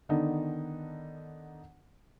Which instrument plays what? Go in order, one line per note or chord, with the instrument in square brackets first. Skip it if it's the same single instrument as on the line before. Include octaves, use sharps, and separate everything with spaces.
[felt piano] D3 D#3 B3 D4 D#4